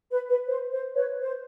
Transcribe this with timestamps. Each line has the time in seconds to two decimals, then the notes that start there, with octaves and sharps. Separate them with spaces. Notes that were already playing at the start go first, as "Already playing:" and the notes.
0.11 B4
0.29 B4
0.47 C5
0.71 C5
0.95 B4 C#5
1.19 C5